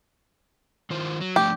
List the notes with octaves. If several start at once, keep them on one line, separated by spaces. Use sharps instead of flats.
D#3 F4 C5
F#3
F3 A3 D4 G4